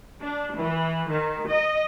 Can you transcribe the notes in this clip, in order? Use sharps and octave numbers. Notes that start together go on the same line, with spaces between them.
D4
E3
D#3
D#5